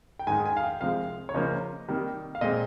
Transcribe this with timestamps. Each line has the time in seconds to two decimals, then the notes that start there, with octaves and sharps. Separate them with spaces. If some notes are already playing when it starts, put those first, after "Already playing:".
0.19 G5
0.27 G#2 D#3 G#3 G#5
0.46 G#5
0.57 F5
0.63 G5
0.81 C2 C3 F3 G#3 F5
1.29 C#5
1.34 C#2 C#3 F3 A#3 C#4 D#5
1.88 C3 D#3 G3 A#3
2.35 F5
2.41 A#2 G#3 C4 D#5